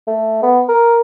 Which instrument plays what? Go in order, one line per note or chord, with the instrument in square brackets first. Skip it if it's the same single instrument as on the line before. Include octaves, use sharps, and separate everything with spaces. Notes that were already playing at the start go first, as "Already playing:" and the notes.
[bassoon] A3
B3
A#4